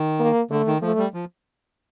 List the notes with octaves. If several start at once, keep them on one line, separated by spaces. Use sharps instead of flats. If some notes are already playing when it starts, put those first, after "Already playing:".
Already playing: D#3
A#3
D3 A3
D#3
F3 A3
G3
F3